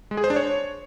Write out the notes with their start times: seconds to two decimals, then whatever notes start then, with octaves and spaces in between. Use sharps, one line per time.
0.11 G#3
0.17 G#4
0.24 C5
0.30 D4
0.36 C#5